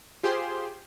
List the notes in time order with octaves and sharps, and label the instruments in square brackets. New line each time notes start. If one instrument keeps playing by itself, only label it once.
[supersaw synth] F4 G4 G#4 C5 C6